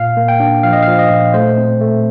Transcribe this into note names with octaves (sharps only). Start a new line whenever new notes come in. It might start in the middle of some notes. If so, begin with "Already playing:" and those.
Already playing: A#2 F5
A#3
G5
D4
F3 F5
D#5
F3 F5
D#5
A#2
A3 C5
C4
A3